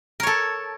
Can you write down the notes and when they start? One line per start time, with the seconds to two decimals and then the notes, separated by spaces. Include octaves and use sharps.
0.20 A#4
0.23 C#5
0.27 A4